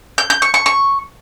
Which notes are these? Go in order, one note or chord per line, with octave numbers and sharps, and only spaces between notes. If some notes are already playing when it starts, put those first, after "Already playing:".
G6
G6
C#6
C#6
C#6